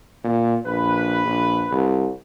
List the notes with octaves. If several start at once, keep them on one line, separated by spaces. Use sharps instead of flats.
A#2
A#1 B4
A#1
C2